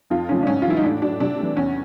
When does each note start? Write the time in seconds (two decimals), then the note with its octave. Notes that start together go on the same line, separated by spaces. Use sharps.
0.10 F2 F4
0.29 C#3 F3 A3 C#4
0.43 D4
0.47 G#2 C#4
0.62 F4
0.65 E3 G3 E4
0.77 D#4
0.84 A2 D4
1.02 F#3 A3 D4
1.20 C3 D4
1.39 E3 A3
1.57 E2 C#4